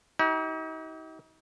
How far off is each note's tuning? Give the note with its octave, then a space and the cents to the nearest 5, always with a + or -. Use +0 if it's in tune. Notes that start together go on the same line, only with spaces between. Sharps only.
D#4 +40 G4 -40